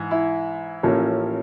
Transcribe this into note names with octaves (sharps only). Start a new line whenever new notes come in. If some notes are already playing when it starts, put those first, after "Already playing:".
Already playing: G#2 E3
E4
A1 A2 F3 A#3 C#4